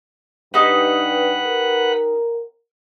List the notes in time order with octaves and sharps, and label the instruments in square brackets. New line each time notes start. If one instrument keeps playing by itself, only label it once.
[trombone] G2 [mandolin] D#4 G4 [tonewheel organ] B4 F#5
[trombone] A#4